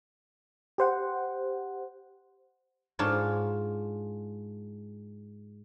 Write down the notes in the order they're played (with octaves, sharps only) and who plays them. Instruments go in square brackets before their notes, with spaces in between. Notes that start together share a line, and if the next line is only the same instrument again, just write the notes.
[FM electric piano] G4 C5 F#5
[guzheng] G#2 D4 F4 C#5